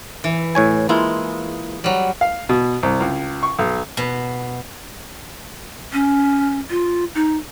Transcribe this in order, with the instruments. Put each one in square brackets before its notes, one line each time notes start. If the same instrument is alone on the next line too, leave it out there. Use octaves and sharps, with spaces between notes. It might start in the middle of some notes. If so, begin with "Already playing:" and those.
[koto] E3
[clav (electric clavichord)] A2 C#5 G#5
[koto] G#3 [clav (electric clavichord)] A#3 E4 F4
[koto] F#3 G3
[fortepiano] F5
B2
C2
C#2
C#6
B1
[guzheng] B2
[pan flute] C#4
F4
D#4